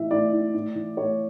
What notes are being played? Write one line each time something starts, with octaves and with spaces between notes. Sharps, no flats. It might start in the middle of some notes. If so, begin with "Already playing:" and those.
Already playing: A2 E3 E5
A2 D5
E3
A2
E3
A2 C#5